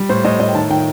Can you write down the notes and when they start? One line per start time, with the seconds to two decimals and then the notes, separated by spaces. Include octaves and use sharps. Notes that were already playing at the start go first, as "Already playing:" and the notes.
Already playing: G3
0.09 A2 C5
0.24 A2 D#5
0.40 A2 D#5
0.49 G5
0.55 D#3 A5
0.70 D#3 G5